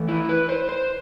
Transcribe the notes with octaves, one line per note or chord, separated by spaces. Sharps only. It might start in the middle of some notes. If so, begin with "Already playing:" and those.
Already playing: E3 A3
E4
B4
C5
C5